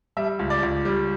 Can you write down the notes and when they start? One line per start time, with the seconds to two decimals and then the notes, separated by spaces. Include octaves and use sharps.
0.17 G3 E5
0.39 C#2
0.50 D5
0.63 C#2
0.85 G3